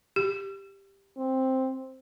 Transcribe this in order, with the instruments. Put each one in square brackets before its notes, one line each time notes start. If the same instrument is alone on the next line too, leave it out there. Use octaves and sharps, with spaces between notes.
[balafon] G4
[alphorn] C4